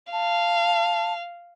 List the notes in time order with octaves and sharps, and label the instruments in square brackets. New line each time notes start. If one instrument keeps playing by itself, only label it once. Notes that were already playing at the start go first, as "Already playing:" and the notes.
[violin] F5 [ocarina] A5